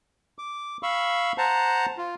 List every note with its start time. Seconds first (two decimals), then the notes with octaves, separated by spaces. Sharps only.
0.38 D6
0.83 F5 B5 C#6 E6
1.38 C5 F#5 A5 A#5
1.97 F4